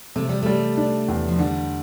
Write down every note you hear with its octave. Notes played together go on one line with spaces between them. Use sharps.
C3 A3
G3
G3 A3
D4
E2
F3
D3 G3